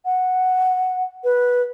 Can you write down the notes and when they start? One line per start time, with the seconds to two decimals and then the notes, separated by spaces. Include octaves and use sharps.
0.05 F#5
1.24 B4